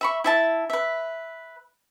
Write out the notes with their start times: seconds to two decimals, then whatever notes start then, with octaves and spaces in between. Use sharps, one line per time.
0.01 E5 B5 C#6
0.24 E4 E5 A5
0.70 B4 E5